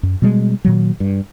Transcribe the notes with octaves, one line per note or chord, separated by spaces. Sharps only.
F#2
B2 G3 G#3
A#2 D#3 F#3
G2